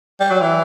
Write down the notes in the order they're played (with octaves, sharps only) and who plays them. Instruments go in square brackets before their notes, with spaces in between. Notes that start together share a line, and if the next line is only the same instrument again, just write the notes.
[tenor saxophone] G3
F#3
E3